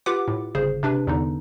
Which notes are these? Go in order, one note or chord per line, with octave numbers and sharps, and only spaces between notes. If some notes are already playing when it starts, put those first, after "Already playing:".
F4 G4 B4 F#5 D6
A2
G1 C#3 G#4 C5
C3 D4 B4
E2 D3 D#4